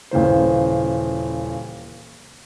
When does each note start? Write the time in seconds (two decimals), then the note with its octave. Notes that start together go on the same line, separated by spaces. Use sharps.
0.11 D#1 C#3 E3 C5